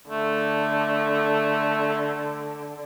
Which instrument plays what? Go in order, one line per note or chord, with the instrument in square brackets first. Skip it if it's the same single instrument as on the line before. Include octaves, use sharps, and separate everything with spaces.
[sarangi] D3 [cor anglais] A3